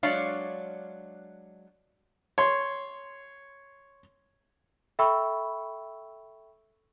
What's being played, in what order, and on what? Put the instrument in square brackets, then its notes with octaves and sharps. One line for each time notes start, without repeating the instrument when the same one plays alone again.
[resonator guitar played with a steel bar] F#3 G#3 D4 C#5 D5 F5
[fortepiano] C#5 C6
[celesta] A4 E5 G5 B5 C#6 E6